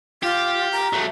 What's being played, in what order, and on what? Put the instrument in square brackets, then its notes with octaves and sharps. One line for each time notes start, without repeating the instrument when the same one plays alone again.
[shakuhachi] F4 [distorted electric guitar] G4
[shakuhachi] A#5
[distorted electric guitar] F#3 A3